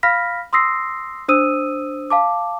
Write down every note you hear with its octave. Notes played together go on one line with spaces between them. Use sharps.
F5 B5 F6 A#6 B6
C6 D#6 E6 A#6 C7
D4 C5 D#6 E6 D#7
F5 A5 D6